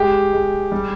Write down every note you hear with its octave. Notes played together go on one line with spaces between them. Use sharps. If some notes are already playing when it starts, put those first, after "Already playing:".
Already playing: G#3 G4
G#3
G3